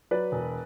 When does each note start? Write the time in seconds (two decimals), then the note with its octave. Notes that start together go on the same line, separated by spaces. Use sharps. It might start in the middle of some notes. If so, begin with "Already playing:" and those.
0.11 F#3 B4 D5
0.32 E1